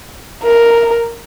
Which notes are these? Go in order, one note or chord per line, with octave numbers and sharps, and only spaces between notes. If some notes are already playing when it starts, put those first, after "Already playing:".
A#4